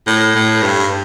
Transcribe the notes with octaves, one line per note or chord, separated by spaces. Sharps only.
A2
A2
G2